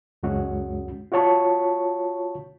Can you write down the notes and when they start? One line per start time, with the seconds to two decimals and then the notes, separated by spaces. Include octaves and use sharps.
0.23 C#2 F#2 G#3 C#4 F#4
1.12 F4 F#4 C#5 A5 C#6